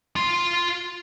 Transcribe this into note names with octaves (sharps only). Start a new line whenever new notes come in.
F4 C6